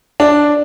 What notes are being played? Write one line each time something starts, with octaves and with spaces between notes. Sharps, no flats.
D4